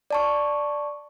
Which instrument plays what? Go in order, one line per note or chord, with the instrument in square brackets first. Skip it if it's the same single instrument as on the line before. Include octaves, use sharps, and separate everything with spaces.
[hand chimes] D5 A5 C#6